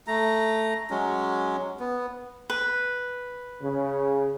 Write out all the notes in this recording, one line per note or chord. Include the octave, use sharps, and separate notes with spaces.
A3 A#5
F#3 G#3 C#4
B3
B4
C#3